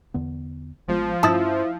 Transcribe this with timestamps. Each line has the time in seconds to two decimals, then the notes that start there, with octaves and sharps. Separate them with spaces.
0.14 E2 D3 B3
0.88 A1 F3 G#3 B3
1.23 G2 C#4 E4 A5 D#6 A6